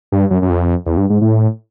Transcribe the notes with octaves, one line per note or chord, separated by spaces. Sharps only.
G2
F#2
F#2
F2
E2
G2
G#2
A2